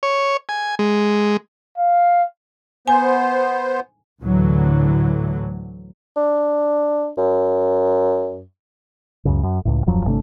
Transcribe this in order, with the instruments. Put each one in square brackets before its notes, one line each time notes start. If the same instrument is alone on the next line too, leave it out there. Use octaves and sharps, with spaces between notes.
[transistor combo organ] C#5
G#5
G#3
[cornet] F5
[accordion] B3 C5 [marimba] G#5
[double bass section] D2 A2 D3 E3 F#3
[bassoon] D4
F#2
[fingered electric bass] C#2 F#2 C#3
F#2
C#2 A2
D#1 F#2 F3 F#3
G1 C3 A3 D4